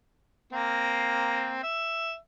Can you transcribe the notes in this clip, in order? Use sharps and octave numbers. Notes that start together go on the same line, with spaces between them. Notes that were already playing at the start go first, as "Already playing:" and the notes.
A#3 C4
E5